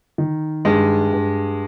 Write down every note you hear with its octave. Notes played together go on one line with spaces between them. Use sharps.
D#3
G2 G#3
G2